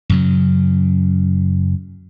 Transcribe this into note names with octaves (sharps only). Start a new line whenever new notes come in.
F#2 C#3 F#3